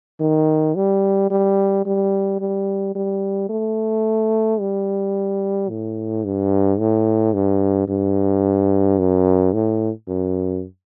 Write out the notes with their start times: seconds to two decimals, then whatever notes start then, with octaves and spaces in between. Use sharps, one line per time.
0.20 D#3
0.75 G3
1.31 G3
1.86 G3
2.40 G3
2.95 G3
3.50 A3
4.60 G3
5.69 A2
6.25 G2
6.79 A2
7.34 G2
7.88 G2
8.99 F#2
9.53 A2
10.08 F#2